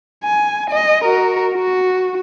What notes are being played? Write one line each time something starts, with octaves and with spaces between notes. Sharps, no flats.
G#5
D#5
F#4 A#4
F#4